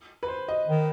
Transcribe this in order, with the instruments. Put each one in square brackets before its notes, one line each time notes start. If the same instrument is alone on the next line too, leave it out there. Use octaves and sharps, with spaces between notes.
[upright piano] B4
C5
D#5
[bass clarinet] D#3